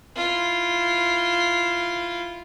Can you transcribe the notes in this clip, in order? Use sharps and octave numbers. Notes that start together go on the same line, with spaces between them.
E4 F4